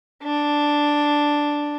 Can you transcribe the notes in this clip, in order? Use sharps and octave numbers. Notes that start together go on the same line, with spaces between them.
D4